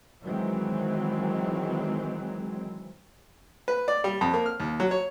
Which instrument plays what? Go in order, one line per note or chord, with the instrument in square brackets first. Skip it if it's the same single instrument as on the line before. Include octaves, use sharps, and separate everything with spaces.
[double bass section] D#3 E3 F#3 G#3 C4
[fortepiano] B4
D5
G3
F2
A#3
F6
D#2
F#3
C#5